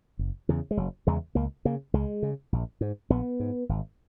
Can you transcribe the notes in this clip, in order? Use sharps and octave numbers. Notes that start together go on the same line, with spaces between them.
F#1
E2 C#3
G#3
F#1 F#3
E2 C#3 G#3
C#2 A#3
C#3 A#3
C#2 G#3
C#3
A#1
G#2
A#1 B3
G#2
G#1